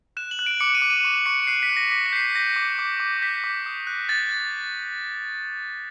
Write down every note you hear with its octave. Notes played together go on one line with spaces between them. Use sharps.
F#6 E7
F#7
F#6
D7
D6 C#7
D#7
D6
D#7
C#6 D#7
C#6 C#7
F#6 C7
B6
F#6
A#6
D6 B6
B6
G6 C7
B6
G6 A#6
D6
D6
D6
G6 B6
D6
D#6
F#6
F#6 A6
F#6